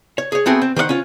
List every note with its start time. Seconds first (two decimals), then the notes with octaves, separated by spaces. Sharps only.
0.18 C#5
0.32 G#4 C#5
0.46 A3 B3 C4 F#4 G#4
0.62 C4
0.76 D#3 C5 D5 F#5
0.89 C#4 F4